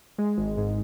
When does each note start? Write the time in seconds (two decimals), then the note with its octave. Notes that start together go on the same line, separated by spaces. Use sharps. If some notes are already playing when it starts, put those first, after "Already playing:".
0.18 G#3
0.38 G#1
0.57 G#2